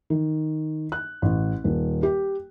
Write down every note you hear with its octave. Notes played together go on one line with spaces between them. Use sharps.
D#3
F#6
A1
D#1
G4